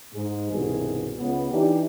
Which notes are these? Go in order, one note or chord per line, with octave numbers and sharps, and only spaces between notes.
G#2 G#3
C2 G2 B2 D#3 G#4
C#2 C#3 B3
E3 D4 D#4 G4